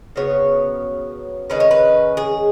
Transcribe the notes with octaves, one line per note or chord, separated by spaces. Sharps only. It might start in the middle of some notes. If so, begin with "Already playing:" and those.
C#3 F#3 B3 C#5
D#3 G#3 C#4 B4
C#5
B4
G#4